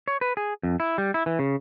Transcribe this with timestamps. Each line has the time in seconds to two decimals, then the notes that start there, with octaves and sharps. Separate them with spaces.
0.08 C#5
0.21 B4
0.37 G#4
0.63 F2
0.80 E4
0.98 G3
1.14 E4
1.26 E3
1.39 C#3